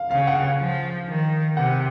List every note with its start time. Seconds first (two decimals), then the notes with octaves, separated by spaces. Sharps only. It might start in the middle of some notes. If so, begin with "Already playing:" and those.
Already playing: F5
0.11 C#3 F5
0.27 F#5
0.35 F5
0.59 F3
1.08 D#3
1.56 C3 F#5